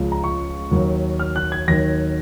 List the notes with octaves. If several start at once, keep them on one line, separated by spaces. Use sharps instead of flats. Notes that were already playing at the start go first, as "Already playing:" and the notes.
Already playing: C#2 C#3 F3
A#5
C#6
D#2 D#3 F#3
F6
F#6
G#6
D#2 D#3 F#3 A#6